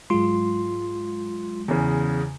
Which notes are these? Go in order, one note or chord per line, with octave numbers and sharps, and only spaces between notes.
G#2 F#3 G#3 F4 C6
E2 C#3